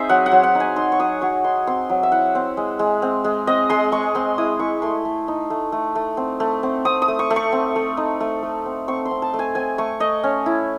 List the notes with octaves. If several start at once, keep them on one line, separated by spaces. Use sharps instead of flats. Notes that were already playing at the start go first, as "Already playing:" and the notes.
Already playing: C4 D#4 G#4 C5 E5
F#3 F#5
F#5
F#3
F#5
D#4
G#5
D#4 C6
C#6
F#3 D#6
F#3 C#6
D#4 C6
C4 C6
F#3
E5
E4 F#5
C4
G#3
G#3
C4
G#3
C4 D#5
G#3 C6
G#3 C#6
C4 C6
E4 D#6
E4 C#6
A3 C6
A3
D#4
A3
A3
A3
C4
A3
C4
C4 D#6
D#6
A3
C#6
A3
C#6
C4
A3
D#4
A3
A3
C4
C4 C#6
C6
C4
A5
A3
G#5
C4 G#5
A3 C#6
A3 D#5
C#4
E4